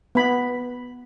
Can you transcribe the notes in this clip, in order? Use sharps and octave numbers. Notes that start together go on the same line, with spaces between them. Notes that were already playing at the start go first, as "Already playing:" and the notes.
B3 B5